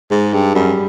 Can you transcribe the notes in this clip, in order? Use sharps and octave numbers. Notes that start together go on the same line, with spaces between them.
G#2 G#3
G2
F#2 G3